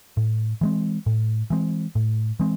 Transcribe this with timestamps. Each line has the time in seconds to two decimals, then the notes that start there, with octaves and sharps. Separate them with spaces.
0.17 A2
0.61 E3 G#3 C4
1.06 A2
1.50 E3 G#3 C4
1.95 A2
2.40 E3 G#3 C4